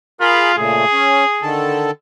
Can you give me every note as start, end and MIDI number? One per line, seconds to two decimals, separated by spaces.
0.21 0.53 65
0.21 0.52 68
0.21 0.52 70
0.21 0.52 83
0.57 0.85 46
0.57 0.85 49
0.57 0.85 57
0.57 1.56 68
0.92 1.25 61
1.42 1.91 50
1.42 1.91 51
1.42 1.91 69